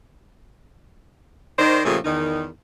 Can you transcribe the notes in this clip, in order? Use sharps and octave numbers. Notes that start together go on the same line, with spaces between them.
D#3 C5 D5
A#2 C#3 F3 A3 G4 G#4
E2 D#3 D#4